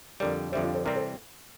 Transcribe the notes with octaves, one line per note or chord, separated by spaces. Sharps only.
F2 D3 G3 A#4 D5
F2 D3 G3 C5 E5
D4 F4
A4 C5
C3 E3 G3 C4 A#4 D5
A4 C5